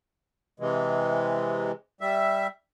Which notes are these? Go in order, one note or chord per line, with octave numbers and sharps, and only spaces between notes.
C3 E3 G#3
G3 E5